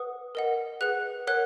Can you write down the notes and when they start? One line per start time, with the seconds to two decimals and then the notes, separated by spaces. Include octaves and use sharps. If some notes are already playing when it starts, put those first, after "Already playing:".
Already playing: B4 F#5 D#6
0.35 A#4 D#5 F#5
0.81 G#4 B4 F#5 F#6
1.27 A#4 C#5 F#5 F#6